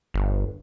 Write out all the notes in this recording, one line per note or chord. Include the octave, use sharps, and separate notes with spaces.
G1